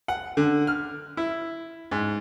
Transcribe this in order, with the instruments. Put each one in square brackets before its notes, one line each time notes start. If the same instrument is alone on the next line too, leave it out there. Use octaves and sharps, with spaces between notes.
[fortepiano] F#5
D3
F6
E4
G#2